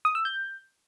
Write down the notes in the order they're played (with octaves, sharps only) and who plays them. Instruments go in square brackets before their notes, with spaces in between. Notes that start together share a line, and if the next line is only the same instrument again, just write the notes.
[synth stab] D#6
E6
G6